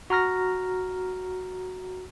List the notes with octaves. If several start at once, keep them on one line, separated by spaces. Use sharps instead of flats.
F#4 A#5 F6 A#6